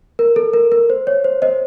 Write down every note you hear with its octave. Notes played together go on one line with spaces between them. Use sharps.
A#4
A4
A#4
A#4
C5
C#5
C5
C5 D#5